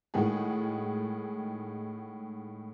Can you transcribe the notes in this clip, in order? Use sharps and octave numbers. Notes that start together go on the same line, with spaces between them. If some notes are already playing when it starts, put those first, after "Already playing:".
A2 D#3 G#3 F#4 G#4